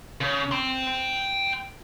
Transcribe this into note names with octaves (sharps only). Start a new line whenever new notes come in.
C#3
G5 C6